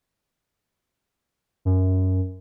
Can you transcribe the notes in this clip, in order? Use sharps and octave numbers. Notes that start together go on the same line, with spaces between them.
F#2